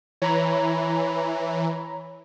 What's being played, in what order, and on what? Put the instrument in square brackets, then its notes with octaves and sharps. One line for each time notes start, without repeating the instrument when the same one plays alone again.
[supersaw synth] E3 [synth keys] C#5 A#5 B5